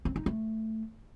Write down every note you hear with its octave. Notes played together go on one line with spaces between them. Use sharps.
C4
D#4
A3